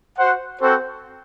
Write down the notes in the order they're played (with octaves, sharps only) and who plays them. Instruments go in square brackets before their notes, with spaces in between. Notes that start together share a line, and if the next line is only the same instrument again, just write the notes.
[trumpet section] F#4 C5 F#5
C4 F#4 A4 C5